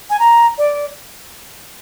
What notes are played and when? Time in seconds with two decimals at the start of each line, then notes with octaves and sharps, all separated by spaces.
0.10 G#5
0.19 A#5
0.58 D5